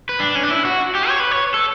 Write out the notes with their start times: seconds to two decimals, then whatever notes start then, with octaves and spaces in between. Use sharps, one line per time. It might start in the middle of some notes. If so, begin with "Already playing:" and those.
0.09 B4
0.20 D4
0.35 C#4
0.43 D4
0.50 E4
0.65 F#4
0.95 G4
1.09 C#5
1.20 B4
1.31 C#5
1.54 A4